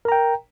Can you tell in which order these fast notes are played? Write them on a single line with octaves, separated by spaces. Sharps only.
A#4 A#5 G5